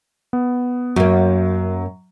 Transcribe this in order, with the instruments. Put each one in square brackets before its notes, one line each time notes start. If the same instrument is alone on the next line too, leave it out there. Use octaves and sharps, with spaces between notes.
[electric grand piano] B3
[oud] F#2 A#3 [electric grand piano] F#3